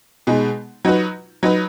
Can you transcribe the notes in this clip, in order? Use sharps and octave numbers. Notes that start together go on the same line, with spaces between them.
B2 G#3 D#4
F#3 D#4 F#4 B4
F#3 D#4 B4